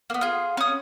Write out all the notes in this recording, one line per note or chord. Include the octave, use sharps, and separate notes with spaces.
A#3 B3
F4 G#4
C#4 D#6